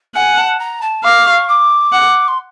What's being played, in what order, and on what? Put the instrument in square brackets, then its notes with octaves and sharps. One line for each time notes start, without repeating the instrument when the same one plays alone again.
[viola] F#5 [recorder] G#5
[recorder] A5
A#5
A5
[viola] F5 [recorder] D6
[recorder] C#6
D6
[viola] F#5
[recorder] C6